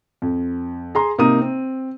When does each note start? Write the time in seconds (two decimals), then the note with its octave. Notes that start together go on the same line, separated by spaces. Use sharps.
0.22 F2
0.95 G#4 A#5 C6
1.18 C3 A#3 D#4 A#5 D#6 D#7
1.41 C4